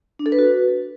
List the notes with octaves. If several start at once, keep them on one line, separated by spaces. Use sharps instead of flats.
D4
A4
B4
F#4